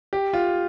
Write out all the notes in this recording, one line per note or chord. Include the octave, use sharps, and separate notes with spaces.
G4
F4